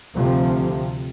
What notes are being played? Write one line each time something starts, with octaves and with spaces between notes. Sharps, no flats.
D2 C3 F3